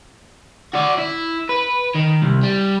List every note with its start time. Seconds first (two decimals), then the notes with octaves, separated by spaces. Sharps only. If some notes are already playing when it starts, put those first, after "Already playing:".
0.73 F#4 D5
0.98 E4
1.49 B4
1.95 D#3
2.23 C2
2.44 G3